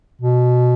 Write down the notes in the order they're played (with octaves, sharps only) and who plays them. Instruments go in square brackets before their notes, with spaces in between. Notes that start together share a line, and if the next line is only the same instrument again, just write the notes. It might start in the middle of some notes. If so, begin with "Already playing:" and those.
[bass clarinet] B2